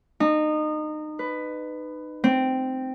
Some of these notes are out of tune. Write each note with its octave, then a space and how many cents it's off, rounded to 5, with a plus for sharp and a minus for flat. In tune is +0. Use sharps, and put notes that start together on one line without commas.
D#4 -25
B4 +15
C4 -10